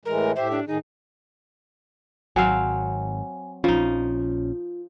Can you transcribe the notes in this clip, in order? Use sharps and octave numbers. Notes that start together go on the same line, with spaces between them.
A2 E3 G#3 A#4
A2 G4 C5 E5
D4
A2 D#3 D#4 G#4
G#1 F#3 C4 F5 G#5
A#1 F3 C#4 D#4 F4